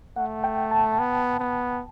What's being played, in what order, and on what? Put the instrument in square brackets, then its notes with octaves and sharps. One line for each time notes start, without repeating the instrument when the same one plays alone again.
[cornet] A3 [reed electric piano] F#5
[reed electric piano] G5
A5
[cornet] B3
B3